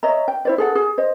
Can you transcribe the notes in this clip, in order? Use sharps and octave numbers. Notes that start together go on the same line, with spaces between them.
C#5 D#5 E5 A#5
G5
E4 C5 D5
G#4 A4 F#5
G#4
C5 D#5